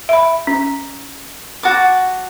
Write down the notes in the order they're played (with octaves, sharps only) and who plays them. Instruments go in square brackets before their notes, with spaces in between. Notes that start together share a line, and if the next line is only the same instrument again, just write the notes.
[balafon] E5 B5
C#4
[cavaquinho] F#4 A5 D6